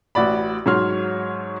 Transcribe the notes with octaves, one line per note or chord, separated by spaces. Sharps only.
A1 F#4 D5 B5
G#2 F#3 C#5 C6 F6